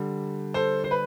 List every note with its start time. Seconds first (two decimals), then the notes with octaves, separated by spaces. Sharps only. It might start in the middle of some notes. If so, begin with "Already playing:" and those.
Already playing: D3 G3
0.54 A4 C5
0.84 C5
0.91 B4